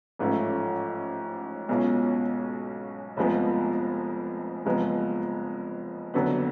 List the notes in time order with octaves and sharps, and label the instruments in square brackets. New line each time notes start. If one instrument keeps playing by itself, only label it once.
[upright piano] A1 G#2 F3 A3 C#4
B1 B2 G#3 C#4 F4
F1 F2 F3 G#3 B3
F#1 F2 F3 G#3 B3
F#1 F2 D3 F#3 B3